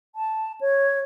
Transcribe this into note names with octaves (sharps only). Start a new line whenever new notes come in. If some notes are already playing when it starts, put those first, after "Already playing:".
A5
C#5